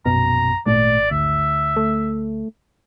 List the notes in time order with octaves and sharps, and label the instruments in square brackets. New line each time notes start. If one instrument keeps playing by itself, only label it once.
[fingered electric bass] A#1 F#2 [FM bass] B2 [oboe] A#5
[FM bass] G#1 [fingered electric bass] A#2 A3 [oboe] D5
[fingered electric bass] D2 [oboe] E5
[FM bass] A3